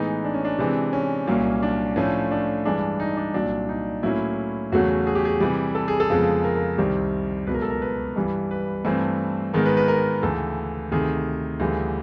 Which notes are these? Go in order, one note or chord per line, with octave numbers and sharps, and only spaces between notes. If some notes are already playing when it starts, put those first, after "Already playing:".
Already playing: A2 E3 G#3 B3 D#4
D4
C#4
D4
C3 E3 G#3 C4
C#4
C2 A#2 F#3 A#3
D4
A2 F3 A3 C#4
D4
G2 E3 G#3 D4
D#4
D4
C2 A#2 F#3 D4
D#4
A2 F#3 A#3 C#4 E4
E2 C#3 F#3 A3 C#4 F#4
G#4
G4
G#4
C3 E3 G3
A4
G#4
A4
F2 C#3 F3 G#3 B3
A#4
A#4
C2 C3 D#3 G3 C4
C#2 B2 F#3 B4
A#4
A4
A#4
B4
G2 E3 G3
B4
G2 E3 A3 C4
G#2 D#3 G#3 B3 A#4
B4
B4
A#4
D2 C#3 E3 A4
D2 C3 D#3 G#4
D2 C#3 E3 G3